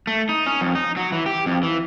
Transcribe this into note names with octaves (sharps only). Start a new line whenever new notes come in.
A3
D#4
C#4
F2
D#4
F#3
E3
G4
F2
E3